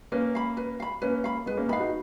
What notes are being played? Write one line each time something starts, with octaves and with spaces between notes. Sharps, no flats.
A#3 C#4 B4
F5 B5
B4
F5 B5
A#3 C#4 B4
F5 B5
G#3 B3 B4
A#3 C#4
B3 D#4 F5 B5
D#4 F#4